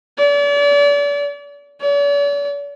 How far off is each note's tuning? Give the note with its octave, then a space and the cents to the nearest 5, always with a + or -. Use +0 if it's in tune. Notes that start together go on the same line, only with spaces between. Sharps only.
D5 -40
D5 -45